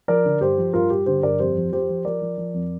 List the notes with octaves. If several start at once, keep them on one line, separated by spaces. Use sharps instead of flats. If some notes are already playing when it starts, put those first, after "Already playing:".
F3 A#4 D5
D3
G2 G4 C5
F3
G2 F4 A#4
G2 G4
D3 G4 C5
G2 A#4 D5
F2 G4 C5
F3
F3 G4 C5
F3
F3 A#4 D5
F3
F3
F2